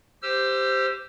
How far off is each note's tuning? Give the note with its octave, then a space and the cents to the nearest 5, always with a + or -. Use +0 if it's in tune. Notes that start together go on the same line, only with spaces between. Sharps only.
G4 +0 C5 -5 E6 +30